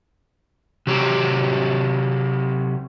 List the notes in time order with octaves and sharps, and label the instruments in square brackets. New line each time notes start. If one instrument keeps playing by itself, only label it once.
[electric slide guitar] C3 F#3 G4